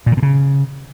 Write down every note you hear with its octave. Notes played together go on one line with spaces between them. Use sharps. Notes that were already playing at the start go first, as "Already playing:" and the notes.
A#2
D#3
B2
C#3